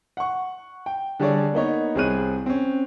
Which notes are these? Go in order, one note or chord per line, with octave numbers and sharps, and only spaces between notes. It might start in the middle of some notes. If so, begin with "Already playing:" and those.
F#5 C#6
G5
D3 G3 G#4 A4 C#5 D5
A#3 B3 D#4 C#5
C2 C4 G#4 C#5 F#6 D#7
C4 C#4